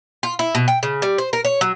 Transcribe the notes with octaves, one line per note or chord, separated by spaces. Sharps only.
F4
E4
B2
G5
C#3
G3
C5
A#4
C#5
F#3